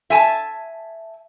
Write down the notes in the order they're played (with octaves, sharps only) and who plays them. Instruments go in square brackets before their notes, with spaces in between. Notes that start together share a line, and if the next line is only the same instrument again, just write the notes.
[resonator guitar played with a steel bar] E5 G#5 A5